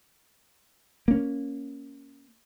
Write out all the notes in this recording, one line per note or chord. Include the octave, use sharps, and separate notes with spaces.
A#3 C#4